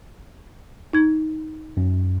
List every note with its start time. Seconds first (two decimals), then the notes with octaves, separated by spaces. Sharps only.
0.93 D#4 G#6
1.77 F#2